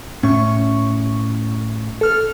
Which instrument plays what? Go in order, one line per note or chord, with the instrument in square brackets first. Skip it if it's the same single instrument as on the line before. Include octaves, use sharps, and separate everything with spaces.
[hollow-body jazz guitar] A2 [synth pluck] C#4 C#6
[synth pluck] A4 F6